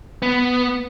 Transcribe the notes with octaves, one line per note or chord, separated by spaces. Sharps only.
B3